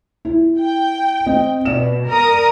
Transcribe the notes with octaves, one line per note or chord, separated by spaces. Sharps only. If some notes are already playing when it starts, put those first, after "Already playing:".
E4
G5
C4 D#5
B2 D5 E7
A#4 A#5 D#6